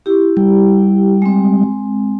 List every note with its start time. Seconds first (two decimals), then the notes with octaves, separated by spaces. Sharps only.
0.06 E4 G4
0.37 G3
1.22 G#3 C4